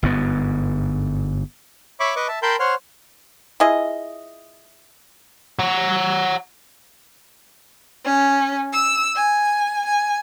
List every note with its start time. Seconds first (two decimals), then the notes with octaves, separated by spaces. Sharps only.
0.03 G1 G#2 B3
2.00 C#5 E5 B5 C#6 D6
2.16 B4 D#5 C#6 D6
2.28 E5 A5
2.42 A#4 G5 A5 B5 C6 G6
2.60 C5 C#5 F#5 C6 F6
3.60 E4 F4 G#4 D#5
5.59 F#5 A#5
8.04 C#4
8.72 E6
9.15 G#5
9.85 G#5